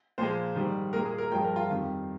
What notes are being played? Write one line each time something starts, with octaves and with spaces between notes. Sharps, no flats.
A#2 F3 G#3 C5
G#2 D#3 G3
A#2 G#3 A#4
G#4
A#4
G2 F3 G#3 G5
A#4
F4
F2 D#3 G3